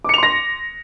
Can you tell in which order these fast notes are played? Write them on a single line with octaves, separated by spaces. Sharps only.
D6 C#7 F7 C6 A#6